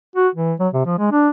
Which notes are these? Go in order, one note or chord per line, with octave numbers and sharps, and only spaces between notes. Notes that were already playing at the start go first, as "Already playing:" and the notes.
F#4
E3
F#3
C3
F3
G#3
D4